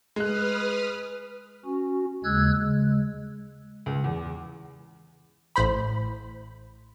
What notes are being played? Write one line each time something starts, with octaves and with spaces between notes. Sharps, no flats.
G#3 B4 D#6 F6 F#6
C#4 F#4
D#2 C#3 G#3 E6 F#6 G#6
C#3 G#3
C#2
E2
A1 A2 C5 B5